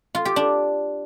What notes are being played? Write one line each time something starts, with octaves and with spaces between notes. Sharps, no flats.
F4
G4
D4